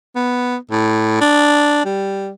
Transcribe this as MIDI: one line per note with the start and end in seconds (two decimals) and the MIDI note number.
0.16 0.56 59
0.71 1.16 45
1.21 1.82 62
1.85 2.29 55